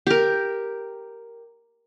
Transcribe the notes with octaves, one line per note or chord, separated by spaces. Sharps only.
G4 A#4